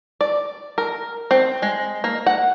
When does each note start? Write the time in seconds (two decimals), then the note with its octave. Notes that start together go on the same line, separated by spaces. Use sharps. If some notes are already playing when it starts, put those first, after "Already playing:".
0.21 D5
0.78 A#4
1.31 C4
1.62 G#3
2.04 A#3
2.26 F#5